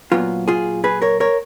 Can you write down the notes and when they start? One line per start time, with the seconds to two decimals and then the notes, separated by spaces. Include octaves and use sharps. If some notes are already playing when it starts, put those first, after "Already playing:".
0.12 A#2 F#3 B3 F4
0.48 F4 G#4
0.84 G#4 B4
1.02 A#4 C#5
1.20 A#4 C#5